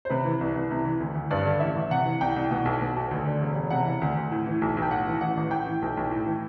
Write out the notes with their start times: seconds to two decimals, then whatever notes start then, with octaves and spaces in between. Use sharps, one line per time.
0.05 C5
0.10 C3 B4
0.25 E3
0.41 C2
0.55 C2
0.71 C3
0.85 E3
1.00 D2
1.15 D2
1.31 G2 D5
1.45 D3
1.60 A1 E5
1.76 A1
1.90 C3 F#5
2.05 E3
2.21 C2 G5
2.36 C2
2.51 B2 F#5
2.65 B1
2.81 B2
2.96 B1
3.11 D2
3.25 D3
3.42 E1
3.55 E1
3.70 C3 F#5
3.86 E3
4.01 D2
4.17 D2
4.31 A2
4.46 E3
4.62 B1
4.77 B1
4.82 G5
4.91 A2 F#5
5.07 E3
5.21 A1 F#5
5.37 A1
5.51 A2 G5
5.66 E3
5.82 B1
5.97 B1
6.11 A2
6.26 E3